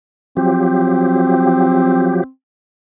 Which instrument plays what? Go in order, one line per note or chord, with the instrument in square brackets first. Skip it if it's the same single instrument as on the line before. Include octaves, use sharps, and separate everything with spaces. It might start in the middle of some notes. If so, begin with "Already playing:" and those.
[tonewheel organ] F3 F#3 G4 [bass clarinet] C4